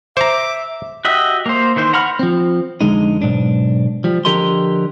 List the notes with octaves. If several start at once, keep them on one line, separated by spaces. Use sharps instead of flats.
C5 E5 A#5 D6
F#4 G4 D#5 E5
A#3 C5
D#3 E3 C5
F#5 A#5 B5 C#6 F6
F3 C4
F2 D3 G#3 D#4
B1 G#2 D4
F3 G3
D3 F3 G4 A#4 D#5 C6